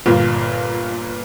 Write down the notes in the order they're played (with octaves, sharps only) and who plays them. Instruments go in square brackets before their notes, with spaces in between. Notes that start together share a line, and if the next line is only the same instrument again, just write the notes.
[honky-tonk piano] G1 A#2 F4